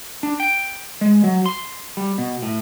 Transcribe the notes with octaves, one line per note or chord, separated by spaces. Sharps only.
D4
G5
G#3
F#3
C6
G3
B2
A2